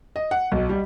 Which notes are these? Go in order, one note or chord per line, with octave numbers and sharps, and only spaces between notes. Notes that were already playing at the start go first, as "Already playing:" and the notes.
D#5
F#5
B1
G3